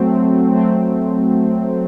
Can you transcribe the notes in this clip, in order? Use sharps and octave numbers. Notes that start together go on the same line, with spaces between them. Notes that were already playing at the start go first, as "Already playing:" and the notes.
Already playing: F#3 A3 C4
F#3 A3 C4